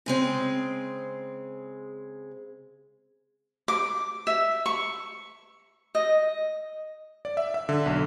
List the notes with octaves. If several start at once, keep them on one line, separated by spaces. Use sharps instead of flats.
C#3 G#3 C4
D6
E5
C#6
D#5
D5
E5
E5
D3
B1